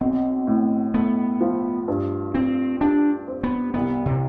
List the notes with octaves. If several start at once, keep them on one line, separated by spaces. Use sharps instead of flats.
B1 C4
A2
A3 B3
F3
G2
F3 C4
D4 G4
C4
B3
C2 B3
C3